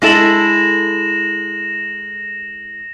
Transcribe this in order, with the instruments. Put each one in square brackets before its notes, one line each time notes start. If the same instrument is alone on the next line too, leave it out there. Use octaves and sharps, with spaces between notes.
[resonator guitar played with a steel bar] G#3 E4 A4 [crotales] A#6 E7 F#7